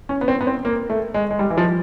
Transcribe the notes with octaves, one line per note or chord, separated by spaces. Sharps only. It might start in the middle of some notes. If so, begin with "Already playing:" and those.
C#4
B3
C4
B3
C4
A#3
A3
G#3
G#3
G3
E3
F3